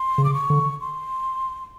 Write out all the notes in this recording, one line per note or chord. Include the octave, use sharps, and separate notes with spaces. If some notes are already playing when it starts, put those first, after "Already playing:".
Already playing: C6
C#3
D6
C#6
D3
C6